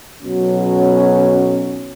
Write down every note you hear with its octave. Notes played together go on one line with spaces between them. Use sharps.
B1 B2 F#3 C#4